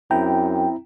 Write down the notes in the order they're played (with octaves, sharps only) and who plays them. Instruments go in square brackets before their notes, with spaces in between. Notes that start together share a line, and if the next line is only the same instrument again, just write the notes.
[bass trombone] F#2 [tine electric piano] C4 E4 A#5 [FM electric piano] G5